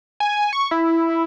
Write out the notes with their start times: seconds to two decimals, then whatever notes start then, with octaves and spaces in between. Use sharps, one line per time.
0.20 G#5
0.53 C#6
0.71 E4